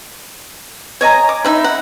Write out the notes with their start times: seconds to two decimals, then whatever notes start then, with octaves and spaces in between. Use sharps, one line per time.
1.01 C#5 D#5 G#5 A#5
1.29 D6
1.45 D#4 E5 B5
1.64 F#5